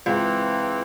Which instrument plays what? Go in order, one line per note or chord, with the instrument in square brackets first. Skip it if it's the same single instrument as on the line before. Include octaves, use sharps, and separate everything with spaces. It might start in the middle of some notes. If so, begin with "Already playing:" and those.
[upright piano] C#2 [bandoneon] E3 C4